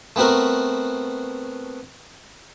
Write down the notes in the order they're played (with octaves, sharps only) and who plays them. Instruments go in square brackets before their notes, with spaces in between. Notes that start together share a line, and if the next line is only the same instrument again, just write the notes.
[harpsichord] A3 B3 C4 F#4 A#4